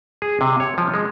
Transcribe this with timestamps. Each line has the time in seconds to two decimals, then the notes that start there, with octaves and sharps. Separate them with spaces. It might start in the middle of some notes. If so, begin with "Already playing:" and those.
0.22 G#4
0.41 C3
0.60 C#5
0.78 F3
0.94 G#3